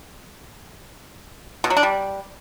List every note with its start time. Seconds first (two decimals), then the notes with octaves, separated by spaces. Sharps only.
1.64 B2
1.70 F#3
1.77 D4
1.83 G3